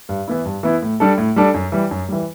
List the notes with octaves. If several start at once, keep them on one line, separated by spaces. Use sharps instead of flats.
G2
E3 B3 E4
G2
E3 B3 E4
A2
G3 D4 A4
A2
G3 D4 A4
F#2
E3 G3
F#2
E3 G3